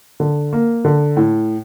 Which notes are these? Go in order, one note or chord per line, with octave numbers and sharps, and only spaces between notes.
D3
A#3
D3
A2